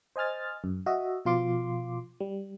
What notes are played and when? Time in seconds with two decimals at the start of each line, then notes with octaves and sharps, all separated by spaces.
0.16 C5 D#5 G#5 F6 A6
0.64 F#2
0.86 F#4 D#5 E5
1.25 B2 F3 F4 C6 D6
2.20 G3